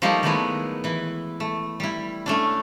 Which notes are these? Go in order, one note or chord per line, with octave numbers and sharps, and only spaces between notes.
F3 G3 A3 A#3 D#4
D#3 F#3 G#3 A3 B3 E4
E3 E4
A3
G3 E4
A3 C#4 D4